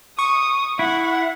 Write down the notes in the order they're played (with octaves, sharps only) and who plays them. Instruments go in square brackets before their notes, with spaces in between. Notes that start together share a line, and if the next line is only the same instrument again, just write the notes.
[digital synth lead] C#6 [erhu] D#6
[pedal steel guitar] E4 [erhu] F#5